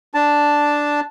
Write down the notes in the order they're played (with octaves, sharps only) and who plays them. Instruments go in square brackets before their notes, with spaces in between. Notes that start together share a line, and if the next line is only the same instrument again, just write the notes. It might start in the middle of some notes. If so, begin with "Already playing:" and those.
[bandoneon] D4 A5